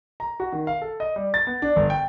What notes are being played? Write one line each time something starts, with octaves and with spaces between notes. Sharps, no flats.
A#5
F#4
D#3
F5
A4
D#5
G3
A6
B3
D4
G1
G5